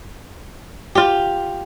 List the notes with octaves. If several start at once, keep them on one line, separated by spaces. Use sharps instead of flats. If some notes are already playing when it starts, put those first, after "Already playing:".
F4 G4